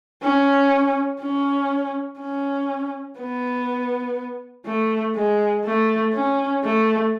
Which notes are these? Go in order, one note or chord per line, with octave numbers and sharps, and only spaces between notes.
C#4
C#4
C#4
B3
A3
G#3
A3
C#4
A3